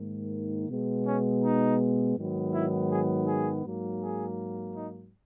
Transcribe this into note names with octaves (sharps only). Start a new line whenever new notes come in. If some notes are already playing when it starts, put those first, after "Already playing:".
Already playing: G#2 D#3 A#3
B2 G#3 B3
C#4
D#4
G#2 D#3 F#3 B3
E4
G#4
G#4
G#2 F#3 A#3
G#4
D#4